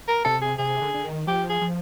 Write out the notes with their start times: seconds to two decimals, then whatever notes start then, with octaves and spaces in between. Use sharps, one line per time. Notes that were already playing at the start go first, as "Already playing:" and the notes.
0.08 A#4
0.25 C3 A4
0.41 G#4
0.58 C3 G#4
0.81 D3
0.94 D3
1.05 D#3
1.27 F3 G4
1.49 G#4
1.61 F3